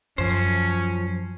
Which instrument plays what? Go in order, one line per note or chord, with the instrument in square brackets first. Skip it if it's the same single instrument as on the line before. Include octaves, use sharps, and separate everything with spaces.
[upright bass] F#2 [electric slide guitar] F3 C5 [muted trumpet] C#4